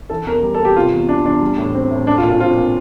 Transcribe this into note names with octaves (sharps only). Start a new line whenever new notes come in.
E3 A4
E2 A#4
G3
A4
A#3
G4
C3 F4
E2
E3 D4
E2 D4
G3
A2
C4
A2
A3 D4
F4
A#2
F4
C4 F4
A#2